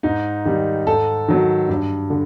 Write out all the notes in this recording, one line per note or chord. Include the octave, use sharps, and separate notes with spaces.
G#2 D#4
D#3 G3
G#2 A4
D#3 F#3
G2
D3